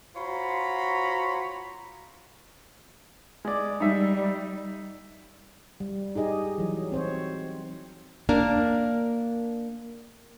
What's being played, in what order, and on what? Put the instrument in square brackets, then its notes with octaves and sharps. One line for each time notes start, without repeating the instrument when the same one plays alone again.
[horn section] F4 F#4 C5 C#5 A#5 B5
[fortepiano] G#3 D5
[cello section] G3 [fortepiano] D#4 E5
[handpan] G3
D#4 G4 G#4 D#5
E3 F#3
C4 C5 C#5
[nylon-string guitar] A#3 D4 A#4